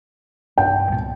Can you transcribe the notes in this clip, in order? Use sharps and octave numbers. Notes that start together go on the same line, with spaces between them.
B1 G2 D4 G5
C2 A#2